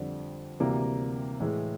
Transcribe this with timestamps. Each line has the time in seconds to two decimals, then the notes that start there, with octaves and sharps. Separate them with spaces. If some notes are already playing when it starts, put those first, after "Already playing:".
Already playing: F2 D3 G3
0.60 D2 C3 E3 G3 A#3
1.40 A2 E3 G#3